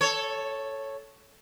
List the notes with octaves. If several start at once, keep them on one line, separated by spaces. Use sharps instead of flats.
A4 C#5